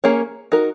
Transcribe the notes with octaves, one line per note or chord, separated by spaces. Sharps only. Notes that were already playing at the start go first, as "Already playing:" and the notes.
A#3 C#4 G#4 C#5
D#4 F#4 A#4